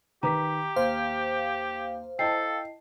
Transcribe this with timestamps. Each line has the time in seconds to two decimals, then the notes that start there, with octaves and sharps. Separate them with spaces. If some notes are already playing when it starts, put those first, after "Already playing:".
0.23 D#3 G4 B4 A#5 D6 B6
0.76 D#2 C5 F5
2.19 E4 A4 D#5 G5 A5 C7